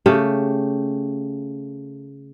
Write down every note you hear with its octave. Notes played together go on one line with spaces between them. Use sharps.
C#3 A3 G4